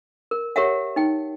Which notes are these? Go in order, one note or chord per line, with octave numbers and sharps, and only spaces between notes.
A#4
G4 A#4 C#5 E5 F#5
D#4 G5